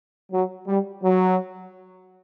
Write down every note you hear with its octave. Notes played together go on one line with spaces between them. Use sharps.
F#3
G3
F#3